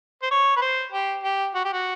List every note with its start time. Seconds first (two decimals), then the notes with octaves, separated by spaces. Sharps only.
0.23 C5
0.31 C#5
0.57 B4
0.62 C5
0.92 G4
1.24 G4
1.55 F#4
1.65 G4
1.73 F#4